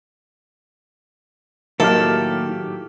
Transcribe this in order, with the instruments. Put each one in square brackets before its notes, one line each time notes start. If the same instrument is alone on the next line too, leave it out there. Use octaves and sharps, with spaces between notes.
[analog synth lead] A2 [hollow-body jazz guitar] D#3 A#3 E4 [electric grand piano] F#3 G4 F6 [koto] A4